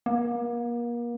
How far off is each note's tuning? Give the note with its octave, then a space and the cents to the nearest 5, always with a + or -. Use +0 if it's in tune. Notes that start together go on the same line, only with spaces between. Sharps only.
A#3 +35